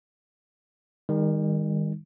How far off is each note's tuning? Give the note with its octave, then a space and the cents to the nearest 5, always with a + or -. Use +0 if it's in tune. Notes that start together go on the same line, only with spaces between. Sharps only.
D#3 +0 G3 +45 D#4 +0